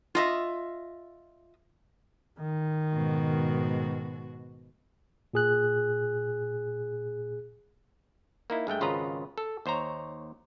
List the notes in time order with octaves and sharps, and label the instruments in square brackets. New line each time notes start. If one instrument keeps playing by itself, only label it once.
[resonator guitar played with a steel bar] F4 D#5 E5
[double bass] D#3
[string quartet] G#2 B2 F#4
[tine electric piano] A#2 G#4 F#6
[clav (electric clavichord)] A#3 D#4 E4
G2 G#3 A3 G5
G#1 C#3 F4 B4 D#5 A#5
A4
D#2 C5 C#5 A#5